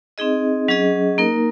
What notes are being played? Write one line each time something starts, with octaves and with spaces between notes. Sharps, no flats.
C4 D#4 G#4 D#5
F#3 C#4 G#4 D#5
A#3 D#4 A#4